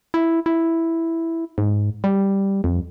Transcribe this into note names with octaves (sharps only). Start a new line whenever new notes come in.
E4
E4
G#2
G3
F2